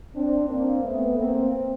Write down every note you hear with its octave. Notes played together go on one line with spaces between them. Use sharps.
C4 D4
A#3 C4
A3 B3
A#3 C4